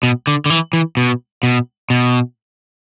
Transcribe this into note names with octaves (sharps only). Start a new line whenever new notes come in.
B2
D3
D3
E3
E3
B2
B2
B2